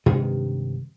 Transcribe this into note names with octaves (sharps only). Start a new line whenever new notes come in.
G2 C3 D#3 G#3